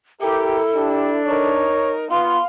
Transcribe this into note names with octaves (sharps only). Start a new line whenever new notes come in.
E4 G4 A4 A#4
D4 G4
D#4 A#4 C#5
B3 F4 F5 C6